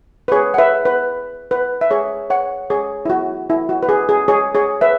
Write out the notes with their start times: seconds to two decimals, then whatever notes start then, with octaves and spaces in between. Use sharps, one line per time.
0.28 B4
0.32 G#4 C#5
0.54 F#5
0.58 B4 E5
0.85 B4
1.51 B4
1.81 E5
1.91 G#4 C#5
2.30 C#5 F#5
2.70 G#4 C#5
3.05 E4
3.10 F#4
3.50 E4
3.69 F#4
3.83 B4
3.89 G#4
4.09 G#4
4.28 G#4 C#5
4.55 G#4 C#5
4.81 B4 E5